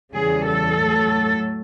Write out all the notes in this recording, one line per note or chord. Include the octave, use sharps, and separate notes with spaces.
E2 C#3 E3 G3 G#4
A4
A2 F#3